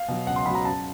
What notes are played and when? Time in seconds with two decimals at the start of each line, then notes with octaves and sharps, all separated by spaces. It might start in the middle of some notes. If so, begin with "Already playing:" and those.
Already playing: F5
0.08 B2 F#3
0.27 C#2 F#5
0.36 C6
0.46 B2 F#3 B5
0.55 A#5
0.65 F#2 A5